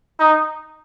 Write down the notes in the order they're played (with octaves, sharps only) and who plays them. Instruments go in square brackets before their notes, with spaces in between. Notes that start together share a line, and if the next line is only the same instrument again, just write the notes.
[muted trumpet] D#4